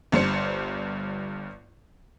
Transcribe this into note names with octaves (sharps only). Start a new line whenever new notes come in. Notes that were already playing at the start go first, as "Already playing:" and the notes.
G1 G2 C5 C#7